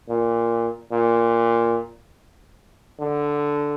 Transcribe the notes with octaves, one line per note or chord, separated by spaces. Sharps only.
A#2
A#2
D3